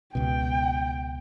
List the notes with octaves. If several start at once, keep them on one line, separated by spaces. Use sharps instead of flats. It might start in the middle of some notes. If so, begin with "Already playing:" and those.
C#2 B2 G5